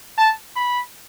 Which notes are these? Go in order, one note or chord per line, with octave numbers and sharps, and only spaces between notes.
A5
B5